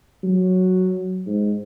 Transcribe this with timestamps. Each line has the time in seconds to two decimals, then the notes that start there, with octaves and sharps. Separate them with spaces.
0.23 F#3
1.26 G#2